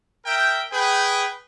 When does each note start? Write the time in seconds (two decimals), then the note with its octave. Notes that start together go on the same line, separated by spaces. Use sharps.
0.26 A#4 E5 G5
0.72 G#4 B4 G5